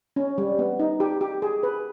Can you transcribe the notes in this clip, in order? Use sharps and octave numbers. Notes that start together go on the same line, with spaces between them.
C#4
G3
B3
D#4
G4
G4
G#4
B4